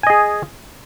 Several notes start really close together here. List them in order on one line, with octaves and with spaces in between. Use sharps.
G#5 D#5 G#4